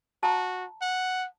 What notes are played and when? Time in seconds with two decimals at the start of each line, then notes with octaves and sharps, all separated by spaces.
0.23 F#4 A5 A#5
0.81 F#5